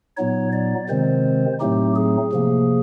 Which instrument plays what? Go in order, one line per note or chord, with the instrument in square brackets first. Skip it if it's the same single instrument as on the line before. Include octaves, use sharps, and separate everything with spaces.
[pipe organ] A#2 F#3 B3 D#4 C#5
D5
C3 D#3 G#3 C4 C5
A2 F#3 A3 C4 D#4 G4
G#4
C3 F3 A#3